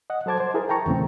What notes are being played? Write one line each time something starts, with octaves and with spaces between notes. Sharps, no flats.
D#5 F#5
F#3 A4 C5 A5 D6 G#6
C5
E4 G#4 A#4
G5 A5 A#5 C#6
E2 A#2 C#3 E3 A3 C4